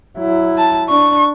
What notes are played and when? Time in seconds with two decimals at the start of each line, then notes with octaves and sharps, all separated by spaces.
0.18 F#3 E4
0.58 A5
0.89 D4 C#6